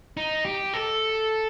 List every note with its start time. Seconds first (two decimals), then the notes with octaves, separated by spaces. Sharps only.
0.17 D#4
0.45 G4
0.74 A4